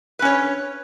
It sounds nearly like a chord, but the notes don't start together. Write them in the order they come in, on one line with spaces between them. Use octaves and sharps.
B4 C#4 C#5